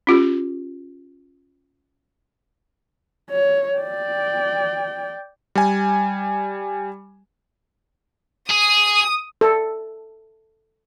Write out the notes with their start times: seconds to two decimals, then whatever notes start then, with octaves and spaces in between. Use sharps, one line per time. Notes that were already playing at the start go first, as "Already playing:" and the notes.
0.07 C#4 F4 G4
3.31 C#5
3.78 D5 G5
5.55 G3 G#5
8.49 G#4 D#6
9.41 A4